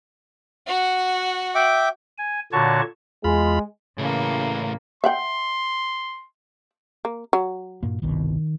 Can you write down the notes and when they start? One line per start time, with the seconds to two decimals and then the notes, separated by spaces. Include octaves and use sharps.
0.67 F#4 F#5
1.55 E5 G5 D6
2.18 G#5
2.52 A#2 D3 F#4 C#5 A5 C#6
3.24 E2 G#3 F4 B5
3.98 A2 C#3 E3 A#3
5.04 E5 F#5 G5 C6
7.05 A#3
7.33 F#3
7.83 G2 A#2 A#3
8.02 G1 C2 B2 D#3